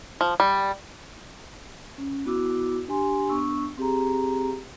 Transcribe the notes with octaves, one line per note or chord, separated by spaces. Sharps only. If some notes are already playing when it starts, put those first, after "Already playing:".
F3
G3
C#4
B3 E4 F#4 D6 E6
D4 G4 G#5 C6
B3 D4 C#6 E6
C4 G4 G#4 A#5